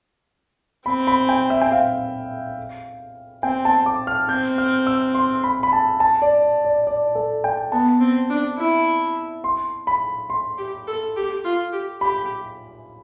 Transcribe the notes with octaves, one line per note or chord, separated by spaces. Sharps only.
C4 B5
B5
G5
E5
G5
F5
C4 G5
A5
D6
F6
C4 G6
F6
E6
C6
B5
B5
A5
A5
D5
D5
D5
A4
G5
B3 A5
C4
D4
E4
C6
B5
C6
G4
A4
G4
F4
G4
G4 B5